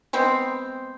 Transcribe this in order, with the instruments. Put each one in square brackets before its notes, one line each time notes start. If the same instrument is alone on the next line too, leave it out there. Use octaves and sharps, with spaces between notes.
[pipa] G#3 B3 C4